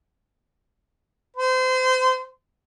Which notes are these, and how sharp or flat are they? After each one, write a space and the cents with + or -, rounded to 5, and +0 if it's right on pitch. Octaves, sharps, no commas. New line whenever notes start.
C5 -30